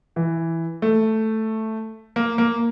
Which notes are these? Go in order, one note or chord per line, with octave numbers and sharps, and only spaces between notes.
E3
A3
A#3
A#3